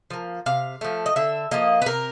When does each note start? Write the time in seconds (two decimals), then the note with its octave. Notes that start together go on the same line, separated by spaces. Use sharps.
0.10 F3 A#3
0.46 C3 F5
0.81 F3 A3
1.06 D#5
1.16 D3 E5
1.51 F3 A#3 D#5
1.82 B4
1.86 C3 A#4